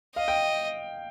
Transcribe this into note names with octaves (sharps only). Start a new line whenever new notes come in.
D#5 F5
G5